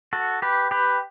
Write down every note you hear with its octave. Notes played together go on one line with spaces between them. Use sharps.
F#4 A4
G4 B4
G4 B4